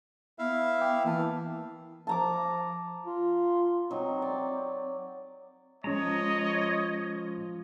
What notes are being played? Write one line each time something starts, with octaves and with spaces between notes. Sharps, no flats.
B3 E4 E5 F5
G5 D6
E3 A#3 A5
F3 A5 A#5 D6
F4
F#3 C4 D#4
D5
F3 G#3 C#4 C#5 D#5 A#5